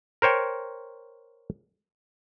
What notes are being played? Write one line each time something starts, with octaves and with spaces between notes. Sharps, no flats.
A#4 C5 C#5 G5